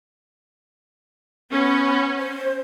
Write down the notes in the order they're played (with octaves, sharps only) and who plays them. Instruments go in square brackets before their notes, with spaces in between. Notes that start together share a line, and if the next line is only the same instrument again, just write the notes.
[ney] B3 [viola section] C#4
[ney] C5